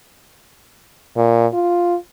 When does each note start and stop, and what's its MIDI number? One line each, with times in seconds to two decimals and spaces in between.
1.17 1.47 46
1.53 1.96 65